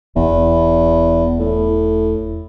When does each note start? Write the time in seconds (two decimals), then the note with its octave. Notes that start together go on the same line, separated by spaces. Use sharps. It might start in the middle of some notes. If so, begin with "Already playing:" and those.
0.16 E1 E2
1.40 A2